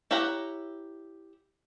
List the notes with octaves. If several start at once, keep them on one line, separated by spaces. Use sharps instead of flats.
E4 G4 C#5 F#5 A#5